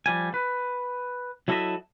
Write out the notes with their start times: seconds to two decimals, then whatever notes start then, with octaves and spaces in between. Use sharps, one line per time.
0.06 F3 G3 G#5
0.34 B4
1.48 F#3 E4 A4 C#5 D#5 E5